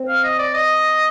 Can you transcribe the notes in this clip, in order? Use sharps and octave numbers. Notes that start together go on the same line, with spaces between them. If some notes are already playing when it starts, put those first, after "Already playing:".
Already playing: C4
F5
D#5
D5
D#5